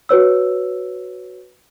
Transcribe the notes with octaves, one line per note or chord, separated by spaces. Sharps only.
F#4 B4 C#5 E6